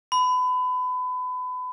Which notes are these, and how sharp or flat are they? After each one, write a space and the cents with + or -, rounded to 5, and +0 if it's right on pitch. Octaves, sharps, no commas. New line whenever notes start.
B5 +30